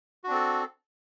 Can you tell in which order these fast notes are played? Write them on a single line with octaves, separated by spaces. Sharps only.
F#4 D4 C4 A4